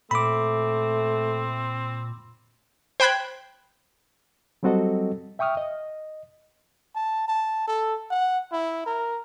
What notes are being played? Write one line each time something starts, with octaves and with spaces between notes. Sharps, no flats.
A#2 A3 C4 B5 D6
C5 G5 B5 F#6 G#6
F#3 G3 C4 F#4 A4 D#5
E5 G5 C#6 D#6 F6
D#5
A5
A5
A4
F#5
E4
A#4